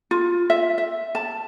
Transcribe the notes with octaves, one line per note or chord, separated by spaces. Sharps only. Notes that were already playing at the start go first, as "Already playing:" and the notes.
F4
E5
E5
A5